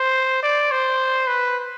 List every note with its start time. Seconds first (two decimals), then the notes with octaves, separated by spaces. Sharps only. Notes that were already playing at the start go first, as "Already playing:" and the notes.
Already playing: C5
0.43 D5
0.72 C5
1.28 B4